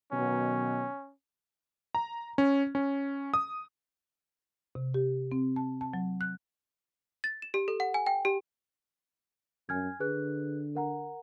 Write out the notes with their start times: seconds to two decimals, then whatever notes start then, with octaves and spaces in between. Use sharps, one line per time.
0.12 B2 D#3 F#3 C#4
1.95 A#5
2.38 C#4
2.75 C#4
3.34 D#6
4.75 C3
4.94 G4
5.32 C4
5.56 A5
5.81 A5
5.94 F#3
6.21 F#6
7.24 A6
7.42 E7
7.54 G4
7.68 A4
7.80 F#5
7.94 G#5
8.06 G5
8.25 G4
9.69 F#2 G#5 F6 G#6
10.00 D3 G#4 B4 F#6
10.75 A#4 F#5 A#5